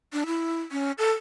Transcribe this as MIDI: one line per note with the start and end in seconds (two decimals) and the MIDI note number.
0.13 0.24 62
0.26 0.61 64
0.72 0.92 61
0.98 1.11 69